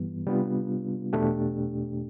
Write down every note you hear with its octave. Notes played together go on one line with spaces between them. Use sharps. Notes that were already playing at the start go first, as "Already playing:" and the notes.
Already playing: G2 E3 G3 B3
C3 G3 B3 D4 F4
E2 B2 A3 D4 G4